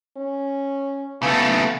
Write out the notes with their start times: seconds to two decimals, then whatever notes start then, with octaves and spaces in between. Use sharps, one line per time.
0.17 C#4
1.23 C#3 A3 B3